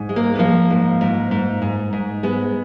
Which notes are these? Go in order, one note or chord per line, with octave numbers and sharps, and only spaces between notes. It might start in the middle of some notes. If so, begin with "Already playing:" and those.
Already playing: G#2
G#3
A#3
B3
F3 A#3
G#2
G#2
G#2
G#2
G#2
G#3 B3